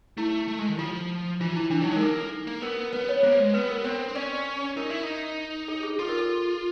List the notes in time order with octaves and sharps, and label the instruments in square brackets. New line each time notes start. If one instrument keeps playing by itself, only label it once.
[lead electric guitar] A3 [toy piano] E4
[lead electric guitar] A3
G#3
D#3
[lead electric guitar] F3 [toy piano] F4
[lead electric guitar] E3 [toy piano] F4
[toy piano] E4
[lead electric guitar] E3 [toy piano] D4
[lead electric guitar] F#3 [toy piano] D#4
[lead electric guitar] G#3
[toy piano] A#4
[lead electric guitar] A#3 [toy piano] A4
[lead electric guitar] A#3
[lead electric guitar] B3 [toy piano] A#4
[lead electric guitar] B3 [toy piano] B4
[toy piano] C#5
[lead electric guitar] A#3 [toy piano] C5
[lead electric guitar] G#3
[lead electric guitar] B3 [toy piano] B4
[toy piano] A#4
[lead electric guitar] C4 [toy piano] C5
[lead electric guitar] C4
[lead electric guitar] C#4 [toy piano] D5
[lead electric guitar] D#4 [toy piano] A#4
[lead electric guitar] E4
D#4
[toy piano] A4
G#4
[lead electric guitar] F4 [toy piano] A4
[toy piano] A#4
A4
A4